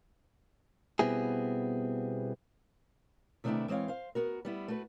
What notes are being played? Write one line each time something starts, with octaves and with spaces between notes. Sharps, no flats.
B2 G3 B3 C4 E4 G#4
C3 D#3 A3 B3 D4 E4
E3 G#3 C4 C#5 F5
C5 F5
B3 F#4 A#4
G3 B3 E4
A3 F#4 B4